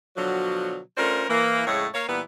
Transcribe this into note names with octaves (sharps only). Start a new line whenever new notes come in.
B2 D3 F3 F#3
A3 C#4 D4 F4 A#4 C5
E3 A#3
F2 A2 C#3 G#3 A3 C#5
A#3 C#5 F5
A#2 E3 G3 B3